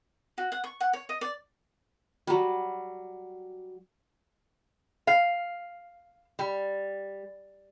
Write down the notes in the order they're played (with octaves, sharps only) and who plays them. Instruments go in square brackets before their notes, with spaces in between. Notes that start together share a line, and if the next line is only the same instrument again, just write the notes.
[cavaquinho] F#4
F#5
C#6
F#5
C#5
D#5
D5
[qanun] F#3 G3
[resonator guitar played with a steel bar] F5
G3